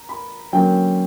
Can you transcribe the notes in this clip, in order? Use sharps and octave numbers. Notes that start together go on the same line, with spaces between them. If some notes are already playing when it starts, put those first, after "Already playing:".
Already playing: A#5
B5
D3 F#3 A#3 C#4 G5